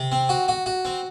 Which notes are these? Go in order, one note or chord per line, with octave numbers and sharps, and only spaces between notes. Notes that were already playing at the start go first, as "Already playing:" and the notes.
Already playing: C3
C4
F#4
F#4
F#4
C4